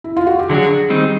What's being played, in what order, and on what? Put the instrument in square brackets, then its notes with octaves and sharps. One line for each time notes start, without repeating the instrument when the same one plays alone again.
[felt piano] E4
F4
F#4
G4
[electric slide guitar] D3 F#3 A3 D4 F#4 [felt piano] G#4
[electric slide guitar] D#3 G3 C4 D#4